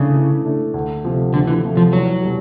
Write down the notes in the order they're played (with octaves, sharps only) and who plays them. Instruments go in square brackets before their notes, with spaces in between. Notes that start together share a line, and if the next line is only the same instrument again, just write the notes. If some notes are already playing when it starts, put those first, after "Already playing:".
Already playing: [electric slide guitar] C#3 [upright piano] E3 A3 D4
[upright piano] E3
A3 D4
D2
C3 F3 A3
[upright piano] D2 [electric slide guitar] D3
[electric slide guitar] E3
[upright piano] C3 F3 A3
[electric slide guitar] F3
[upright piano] E2 [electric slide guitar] F#3
[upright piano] B2 G3